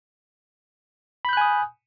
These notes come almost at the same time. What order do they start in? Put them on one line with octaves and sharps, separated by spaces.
B5 G6 F#6 G#5 D#6